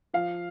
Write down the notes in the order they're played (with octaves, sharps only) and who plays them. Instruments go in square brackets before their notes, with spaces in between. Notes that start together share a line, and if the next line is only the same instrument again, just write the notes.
[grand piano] F3 F5